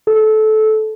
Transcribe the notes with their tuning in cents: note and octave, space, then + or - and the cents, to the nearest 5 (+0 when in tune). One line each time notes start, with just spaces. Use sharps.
A4 -20